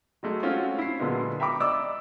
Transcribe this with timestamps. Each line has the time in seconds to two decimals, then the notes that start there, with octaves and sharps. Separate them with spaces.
0.23 F#3 G#3 A3
0.43 C4 C#4 F4 F#4
0.78 E4 C7
0.99 A#2 D3 F#3 G#3 B3
1.40 E5 G5 A#5 B5 C#6 D6
1.60 D5 D#5 D6 E6